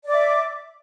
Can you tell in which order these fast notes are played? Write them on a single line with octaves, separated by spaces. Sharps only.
D5 D6 E5